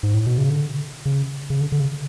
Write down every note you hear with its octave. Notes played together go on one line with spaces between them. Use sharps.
G#2
A2
B2
C#3
D3
C#3
C#3
D3
D3
C#3